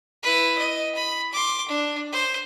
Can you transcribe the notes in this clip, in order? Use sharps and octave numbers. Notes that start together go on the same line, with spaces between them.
E4 B4
D#5
B5
C6 D6
D4
C5